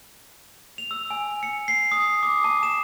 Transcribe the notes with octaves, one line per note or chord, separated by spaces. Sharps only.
F7
E6
G#5
C#7
C7
D#6
D6
A5
E7